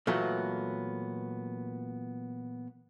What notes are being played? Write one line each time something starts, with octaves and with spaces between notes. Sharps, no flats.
A#2 E3 F#3 A3 B3